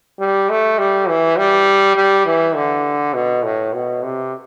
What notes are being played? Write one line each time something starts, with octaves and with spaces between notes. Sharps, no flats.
G3
A3
G3
E3
G3
G3
E3
D3
B2
A2
B2
C3